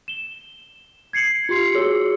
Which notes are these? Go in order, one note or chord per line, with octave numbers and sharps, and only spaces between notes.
E7 G7
G#6 C7 C#7 F#7
F4 G4 C6 C7 C#7
F#4 G#4 C#5 E6